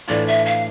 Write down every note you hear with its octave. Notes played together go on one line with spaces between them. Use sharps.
A2 E3 A3 D4 F4 D5
E5
F5